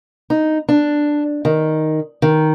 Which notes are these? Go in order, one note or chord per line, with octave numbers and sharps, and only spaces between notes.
D#4
D4
D#3
D#3